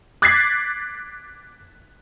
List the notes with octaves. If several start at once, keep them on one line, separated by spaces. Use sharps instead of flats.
D6 F#6 G#6 A6 B6 C7